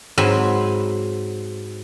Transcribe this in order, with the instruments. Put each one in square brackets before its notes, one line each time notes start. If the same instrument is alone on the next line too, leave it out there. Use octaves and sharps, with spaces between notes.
[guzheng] G#2 F#3 C4 C5 G#5 B5